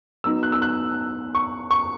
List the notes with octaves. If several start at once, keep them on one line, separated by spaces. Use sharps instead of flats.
F#3 B3 D#4 E6
F#6
E6
F#6
C#6
C#6